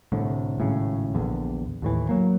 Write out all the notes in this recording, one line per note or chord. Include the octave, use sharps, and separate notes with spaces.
C2 A2 D3
G#1 A2 C#3
A#1 E2 D3
D#2 A2 E3
F#3 A#3